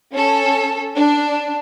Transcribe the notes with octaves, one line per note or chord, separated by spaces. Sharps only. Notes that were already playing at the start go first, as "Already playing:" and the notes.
C#4 A4
D4